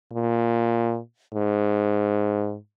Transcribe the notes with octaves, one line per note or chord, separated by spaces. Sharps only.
A#2
G#2